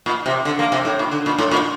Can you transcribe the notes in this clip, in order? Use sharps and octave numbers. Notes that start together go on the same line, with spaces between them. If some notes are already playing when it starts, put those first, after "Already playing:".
A#2
C3
D3
A#3
C3
A2
A#2
D3
A#2
A2
A#2